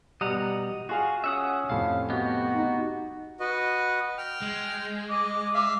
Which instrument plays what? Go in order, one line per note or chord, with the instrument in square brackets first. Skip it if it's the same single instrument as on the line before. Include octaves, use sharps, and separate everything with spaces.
[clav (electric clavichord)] B2 G3 [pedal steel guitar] D#5 F#5 A#5
[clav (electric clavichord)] F4 G#4 F5 [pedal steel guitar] F#4
[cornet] C#4 [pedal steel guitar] E5 F#5 D#6
[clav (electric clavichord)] F2 A2 C3 [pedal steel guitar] F5
[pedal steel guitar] B3 G4 D#5 [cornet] F#4
[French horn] D#4
[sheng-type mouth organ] F#4 B4 D#5
G5 F6
[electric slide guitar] G#3
[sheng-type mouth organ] D#5 [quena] D6
[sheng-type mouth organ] E5 F5